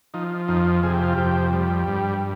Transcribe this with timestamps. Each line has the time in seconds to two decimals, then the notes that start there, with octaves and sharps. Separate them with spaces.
0.14 F3 D#4
0.48 F2 D#4
0.83 C3 G#4
0.94 G4
1.03 F4
1.13 F2 G4
1.53 G3
1.87 G2